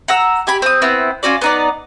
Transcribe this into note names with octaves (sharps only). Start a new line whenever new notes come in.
F#5 A#5 E6
G4 G#5 B5
C4 D#6
B3 C4 E4
C#4 F4 F#4 D5
B3 D#4 D5